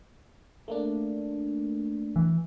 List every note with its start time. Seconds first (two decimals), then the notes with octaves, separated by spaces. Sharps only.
0.68 A3 A#3 D4
2.16 E3